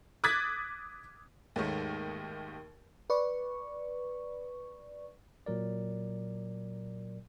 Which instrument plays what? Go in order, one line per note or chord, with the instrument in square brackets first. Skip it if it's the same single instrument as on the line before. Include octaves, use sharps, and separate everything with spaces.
[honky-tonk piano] D6 D#6 F#6 G#6 A6 B6
[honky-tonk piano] D#2 D#3 [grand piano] G#2 A3 C#5
[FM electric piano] B4 D5 C#6
[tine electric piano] A#2 F#3 A#4 D5